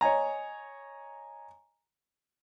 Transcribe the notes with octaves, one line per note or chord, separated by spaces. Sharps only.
C#5 D#5 G#5 A#5